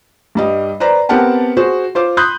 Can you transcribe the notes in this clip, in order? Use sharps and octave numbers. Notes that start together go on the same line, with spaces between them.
G2 G3 D#5
B4 C5 D5 A#5
B3 C4 G4 A#4 F#5 A5
F#4 G#4 C5
F4 C5 D6
B5 C6 D#6 F#6 G6